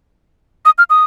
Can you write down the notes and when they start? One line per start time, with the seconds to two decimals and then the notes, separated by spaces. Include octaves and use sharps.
0.65 D#6
0.78 F6
0.90 D#6